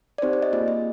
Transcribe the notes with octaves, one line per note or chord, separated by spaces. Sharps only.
D5
C4 D#4 G4 C5
D5
D#5
A#3 F4 G#4 D#5
D#5